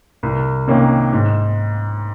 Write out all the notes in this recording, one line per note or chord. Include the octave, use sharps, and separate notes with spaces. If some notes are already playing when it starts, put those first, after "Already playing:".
C2
C3 D#3 A#3 C#4
G#2